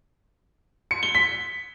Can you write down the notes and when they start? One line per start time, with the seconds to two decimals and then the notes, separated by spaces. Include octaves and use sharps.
0.91 C#7
1.03 G7
1.15 B6